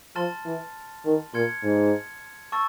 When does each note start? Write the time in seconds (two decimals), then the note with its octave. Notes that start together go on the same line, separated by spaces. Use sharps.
0.16 F3 A5 C6 F6 A6
0.46 E3
1.05 D#3
1.34 A#2 C6 F6 G#6 C#7
1.64 G#2
2.52 A5 C#6 E6 A6